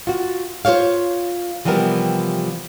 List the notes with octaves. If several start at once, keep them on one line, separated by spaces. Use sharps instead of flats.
F4 F#4
F4 A4 C5 C#5 F5
C3 E3 F3 G3 B3 A#4